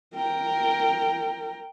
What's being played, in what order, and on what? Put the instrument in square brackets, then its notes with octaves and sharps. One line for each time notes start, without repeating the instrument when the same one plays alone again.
[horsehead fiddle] A#4 G5